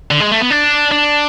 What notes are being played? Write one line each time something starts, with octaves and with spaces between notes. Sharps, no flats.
D3
G#3
A3
B3
D4
D4